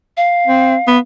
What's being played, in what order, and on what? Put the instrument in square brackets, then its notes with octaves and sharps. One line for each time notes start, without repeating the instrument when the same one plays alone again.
[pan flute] F5
[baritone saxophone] C4
B3